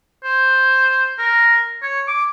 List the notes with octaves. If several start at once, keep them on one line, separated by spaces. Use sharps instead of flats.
C5
A#4
C#5
D6